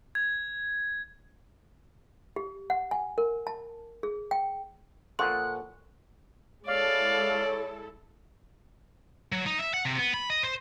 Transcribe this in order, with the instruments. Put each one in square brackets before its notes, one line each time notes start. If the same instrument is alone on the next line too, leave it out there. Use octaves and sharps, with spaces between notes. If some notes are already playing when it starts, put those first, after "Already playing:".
[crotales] G#6
[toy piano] G4
F#5
G#5
A#4
A5
G#4
G5
[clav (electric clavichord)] A#2 F3 [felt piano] A4 F#5 C#6 [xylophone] C6 [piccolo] F#6
[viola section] G#3 E4 A4 [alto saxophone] C#5 [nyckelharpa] D5 [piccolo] F5
[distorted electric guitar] F#3
D#4
E5
F#5
C3
B3
B5
D#5
C5